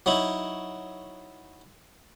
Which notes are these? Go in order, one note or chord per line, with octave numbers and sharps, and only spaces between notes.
F#3 D#4 E4